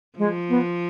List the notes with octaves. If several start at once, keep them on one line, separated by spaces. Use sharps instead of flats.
F3 G#3
B3